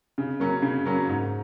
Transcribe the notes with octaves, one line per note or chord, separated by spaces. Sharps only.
C#3
F#3 A#3 C#4
C#3
F#3 A#3 C#4
G#2